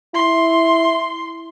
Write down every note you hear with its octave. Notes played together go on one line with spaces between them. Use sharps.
E4 C6